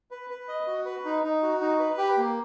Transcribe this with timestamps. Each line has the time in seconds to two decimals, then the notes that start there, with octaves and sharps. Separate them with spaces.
0.11 B4
0.30 B4
0.48 D#5
0.67 F#4
0.85 B4
1.05 D#4
1.23 D#4
1.42 F#4
1.61 D#4
1.79 B4
1.98 G4
2.17 A#3